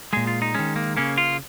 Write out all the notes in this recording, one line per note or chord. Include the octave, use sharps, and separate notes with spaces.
A#2 G#3 G#4
F4
D#4
D#3 G#3 C#4
A#3
C#3 A#3 C#4
F4